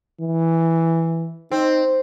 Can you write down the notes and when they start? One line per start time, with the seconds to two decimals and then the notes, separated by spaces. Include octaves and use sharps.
0.21 E3
1.52 C4 D#4